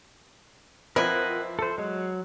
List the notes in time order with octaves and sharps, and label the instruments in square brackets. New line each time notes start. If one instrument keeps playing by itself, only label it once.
[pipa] E3 E4 [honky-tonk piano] F3 C4 [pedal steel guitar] A#4 D#5 F#5
[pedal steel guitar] A4 C5
[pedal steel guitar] F#3 [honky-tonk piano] G#3